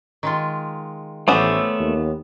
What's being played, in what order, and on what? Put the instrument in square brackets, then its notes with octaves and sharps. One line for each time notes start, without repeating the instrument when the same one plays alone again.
[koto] D#3 G#3 F4
[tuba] A1 [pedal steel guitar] A3 D5 E5 [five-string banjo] B3 C#4 C5
[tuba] D#2